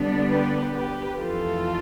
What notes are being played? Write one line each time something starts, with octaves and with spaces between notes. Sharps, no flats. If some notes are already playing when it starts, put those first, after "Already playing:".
Already playing: D3 G3 B3 D4
G4 B4
G4 B4
F2 E3 A3 F4 A4